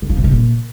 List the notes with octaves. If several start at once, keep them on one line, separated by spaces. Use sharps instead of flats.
D3
F3
C3
C#3
A#2